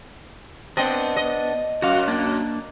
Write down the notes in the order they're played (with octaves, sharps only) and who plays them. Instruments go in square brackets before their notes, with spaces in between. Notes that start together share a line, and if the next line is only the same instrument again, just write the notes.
[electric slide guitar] B3 D4 [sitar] C4 D#5
[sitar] D#5
[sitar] F#2 [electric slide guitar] F#4 F5
[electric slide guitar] A#3 D4